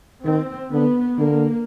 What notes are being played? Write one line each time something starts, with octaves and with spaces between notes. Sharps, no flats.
D#3 C4
D3 B3
D3 A#3